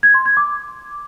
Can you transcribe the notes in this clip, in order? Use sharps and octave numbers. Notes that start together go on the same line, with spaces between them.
G#6
C6
G#6
D6